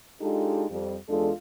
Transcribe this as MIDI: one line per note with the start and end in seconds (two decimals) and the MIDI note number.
0.21 0.65 56
0.21 0.65 62
0.21 0.65 63
0.21 0.65 65
0.21 0.65 67
0.21 0.65 69
0.70 0.95 41
0.70 0.95 55
1.09 1.31 40
1.09 1.31 56
1.09 1.31 62
1.09 1.31 65
1.09 1.31 69